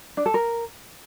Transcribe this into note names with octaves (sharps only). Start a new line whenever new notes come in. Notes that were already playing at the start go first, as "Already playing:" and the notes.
D4
A4
A#4